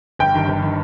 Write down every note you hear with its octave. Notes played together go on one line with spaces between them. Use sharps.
G1 G5
G2 D#3
G1
D#3